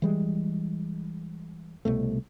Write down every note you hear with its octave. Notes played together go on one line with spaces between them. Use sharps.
E3 G3 G#3
C2 B2 A3